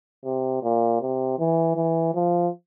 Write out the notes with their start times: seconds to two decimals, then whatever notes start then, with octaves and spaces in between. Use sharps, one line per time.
0.25 C3
0.62 A#2
1.01 C3
1.39 E3
1.76 E3
2.15 F3